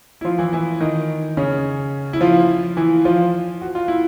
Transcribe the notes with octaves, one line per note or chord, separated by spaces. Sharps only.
E4
F3 F4
E3 E4
E3 E4
D#3 D#4
C#3 C#4
E4
F3 F4
E3 E4
F3 F4
F#4
F4
E4